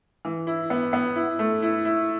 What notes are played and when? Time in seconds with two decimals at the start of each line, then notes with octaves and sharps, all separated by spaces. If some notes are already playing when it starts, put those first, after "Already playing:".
0.25 E3
0.47 E4
0.70 B3
0.93 B3
1.16 E4
1.39 A3
1.62 E4
1.85 E4